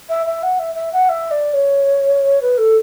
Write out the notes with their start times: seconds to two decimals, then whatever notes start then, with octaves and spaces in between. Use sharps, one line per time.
0.09 E5
0.26 E5
0.43 F#5
0.59 E5
0.75 E5
0.92 F#5
1.09 E5
1.31 D5
1.53 C#5
2.42 B4
2.58 A4